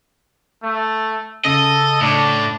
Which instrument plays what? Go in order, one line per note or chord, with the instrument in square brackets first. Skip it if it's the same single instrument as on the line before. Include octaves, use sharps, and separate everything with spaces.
[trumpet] A3
[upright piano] C#3 [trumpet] A4 [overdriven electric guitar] D#5
[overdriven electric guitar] A2 [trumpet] D4